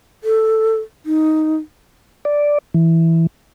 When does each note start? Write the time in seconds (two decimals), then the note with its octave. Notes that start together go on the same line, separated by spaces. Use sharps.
0.24 A4
1.06 D#4
2.25 D5
2.74 E3